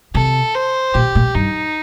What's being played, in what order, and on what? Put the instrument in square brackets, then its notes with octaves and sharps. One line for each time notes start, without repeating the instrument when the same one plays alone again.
[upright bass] C3 [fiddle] A4
[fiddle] C5
[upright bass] A#2 [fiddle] G4
[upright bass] A#2
[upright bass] G2 [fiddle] D#4